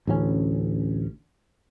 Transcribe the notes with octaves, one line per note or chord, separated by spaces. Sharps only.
A1 D2 F#3 C#4